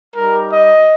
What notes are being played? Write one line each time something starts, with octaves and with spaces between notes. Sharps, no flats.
G3 D#4 G4 A#4
D#5